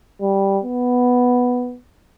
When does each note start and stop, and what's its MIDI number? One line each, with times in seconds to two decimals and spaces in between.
0.21 0.59 55
0.64 1.77 59